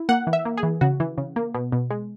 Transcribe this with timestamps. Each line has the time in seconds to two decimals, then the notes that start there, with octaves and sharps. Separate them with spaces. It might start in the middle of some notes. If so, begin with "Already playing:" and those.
Already playing: E4
0.09 A#3 F#5
0.27 E3
0.33 E5
0.45 A#3
0.57 G#4
0.63 E3
0.81 C#3 F#4
1.00 E3
1.18 C#3
1.36 A#3
1.54 B2
1.72 B2
1.90 G#3